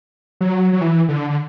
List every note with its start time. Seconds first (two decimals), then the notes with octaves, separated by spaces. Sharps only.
0.41 F#3
0.73 F#3
0.81 E3
1.09 D3
1.30 D3